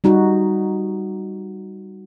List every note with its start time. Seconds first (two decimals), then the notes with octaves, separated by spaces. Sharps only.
0.04 G3 D#4 F#4